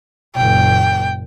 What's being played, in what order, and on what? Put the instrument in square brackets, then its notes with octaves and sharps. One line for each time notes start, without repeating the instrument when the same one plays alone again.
[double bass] F#1 A#2 [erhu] G5